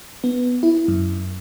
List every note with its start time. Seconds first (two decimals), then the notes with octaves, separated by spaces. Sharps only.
0.24 B3
0.63 E4
0.88 F#2